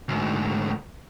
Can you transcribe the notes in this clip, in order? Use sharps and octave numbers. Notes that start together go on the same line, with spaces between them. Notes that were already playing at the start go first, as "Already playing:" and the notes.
D2 G#2